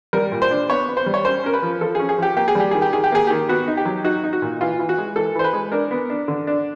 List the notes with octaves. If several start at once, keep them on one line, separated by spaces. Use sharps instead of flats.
G3 A#4
A#2
C5
D4
B3 C#5
B3
C5
G3
C#5
C#4 C5
C#4 A#4
B4
F3
F3 A4
C#4 G#4
G#4
F3 G4
A#3 G4
G#4
G3 G4
D#3 G#4
G4
D#3 G#4
G4
A#3 G#4
D#3 G4
B3 F#4
D#4
G4
F#3
D#4 F#4
D#4
F#4
A#2
E3 F4
E3
F#4
G#3
E3 A4
E3 C5
B4
G#3
D4 A#4
B3
D4
D3
D4